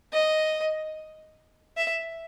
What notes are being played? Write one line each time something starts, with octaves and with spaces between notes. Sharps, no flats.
D#5
E5